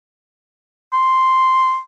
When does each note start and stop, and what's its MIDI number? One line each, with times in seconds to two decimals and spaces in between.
0.93 1.79 84